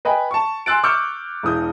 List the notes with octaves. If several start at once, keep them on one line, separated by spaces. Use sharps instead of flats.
B4 D#5 G5 G#5 B5
A5 C#6
G#5 C6 E6 F#6 A6 D7
C#6 D6 E6 F6 G6 C#7
E1 E3 D#6 G6